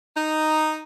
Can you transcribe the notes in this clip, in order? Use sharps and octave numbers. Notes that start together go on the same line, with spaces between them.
D#4